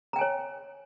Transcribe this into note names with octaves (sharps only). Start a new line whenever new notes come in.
C#5 G5 G#5 A#5